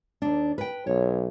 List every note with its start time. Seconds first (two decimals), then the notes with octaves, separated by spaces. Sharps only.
0.22 D#2 D4
0.58 B4 G5
0.87 B1 C#5